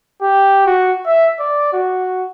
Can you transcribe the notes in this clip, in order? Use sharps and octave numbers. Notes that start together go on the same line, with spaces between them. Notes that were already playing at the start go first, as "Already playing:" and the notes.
G4
F#4
E5
D5
F#4